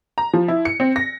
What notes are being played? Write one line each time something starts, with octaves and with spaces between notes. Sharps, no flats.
A#5
F3
E4
C#7
C4
A#6